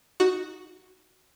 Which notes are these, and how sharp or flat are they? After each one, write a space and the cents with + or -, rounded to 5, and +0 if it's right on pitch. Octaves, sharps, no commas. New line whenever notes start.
D#4 +0 F#4 +0